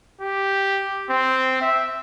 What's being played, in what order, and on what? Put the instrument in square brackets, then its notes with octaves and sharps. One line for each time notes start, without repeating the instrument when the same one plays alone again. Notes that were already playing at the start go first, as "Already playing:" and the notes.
[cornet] G4
C4
E5